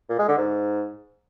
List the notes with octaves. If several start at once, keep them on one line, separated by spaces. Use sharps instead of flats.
A#2
G#3
D3
G#2